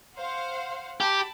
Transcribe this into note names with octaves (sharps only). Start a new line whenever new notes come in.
C5 F5 F#5
G4 G5 A5 B5